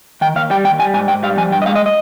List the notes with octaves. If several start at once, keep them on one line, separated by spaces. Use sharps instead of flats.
D#3 G5
D#2 F5
G3 G5
D#2 G5
G3 G#5
G#2 G#5
G#2 G5
G3 F5
F3 G#5
G2 G5
D#5
G#3 F5
D#5
D#5